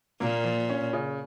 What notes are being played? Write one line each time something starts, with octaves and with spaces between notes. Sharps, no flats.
A#2 A#3
F3
C#4
C#3